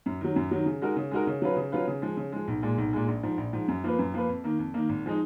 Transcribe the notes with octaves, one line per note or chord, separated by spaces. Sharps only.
F#2
D#3 F#3
F#2
D#3 F#3
C#3
G#3 D#4 F#4 A#4
C#3
G#3 D#4 F#4 A#4
C#3
F#3 C#4 F4 B4
C#3
F#3 C#4 F4 B4
C#3
F3 G#3
C#3
F3 G#3
B1
A#2 G#3
B1
A#2 G#3
A#1
G#2 F3
A#1
G#2 F3
F#2
F3 A#3 F4 B4
F#2
F3 A#3 F4 B4
F2
D#3 A#3
F2
D#3 A#3
G#1
F3 G#3 D#4